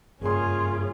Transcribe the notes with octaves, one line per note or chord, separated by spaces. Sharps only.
F#1 G2 C#4 F4 G#4 C6